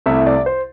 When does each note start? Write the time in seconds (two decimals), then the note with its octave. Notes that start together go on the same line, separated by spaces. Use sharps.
0.06 C2 C3 A3 E4 E5
0.26 D5
0.46 C5